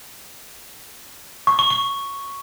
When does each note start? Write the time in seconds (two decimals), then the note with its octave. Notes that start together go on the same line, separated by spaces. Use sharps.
1.47 C#6
1.59 C#6
1.70 C#6